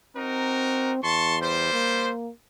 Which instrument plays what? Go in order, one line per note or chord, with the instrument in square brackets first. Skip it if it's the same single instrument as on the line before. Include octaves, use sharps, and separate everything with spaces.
[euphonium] C4 [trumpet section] D#4 F#4 A#4
[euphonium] E2 [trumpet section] A5 C6 C#6
[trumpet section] G3 C5
[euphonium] A#3